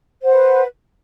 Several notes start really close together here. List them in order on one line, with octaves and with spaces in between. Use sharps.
C5 F#5 B4